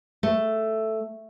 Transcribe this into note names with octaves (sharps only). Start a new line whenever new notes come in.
A3